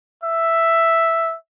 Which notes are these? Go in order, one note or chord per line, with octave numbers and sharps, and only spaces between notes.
E5